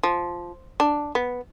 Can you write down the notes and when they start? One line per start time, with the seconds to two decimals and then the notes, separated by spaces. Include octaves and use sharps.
0.03 F3
0.80 D4
1.15 B3